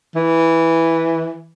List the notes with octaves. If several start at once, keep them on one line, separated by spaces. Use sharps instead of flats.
E3